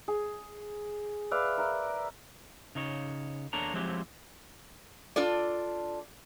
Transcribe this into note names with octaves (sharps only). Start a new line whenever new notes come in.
G#4
B4 D5 E5 F5
A#4 B4 E5
C#3 D#4 C#5
E2 A#3 D4 A4 C#5 A#5
F3 F#3 G#3 C4 E4 G4
D4 F4 A4 D5